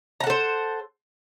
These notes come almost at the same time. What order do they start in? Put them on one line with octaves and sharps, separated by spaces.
A#5 F#5 A4 C5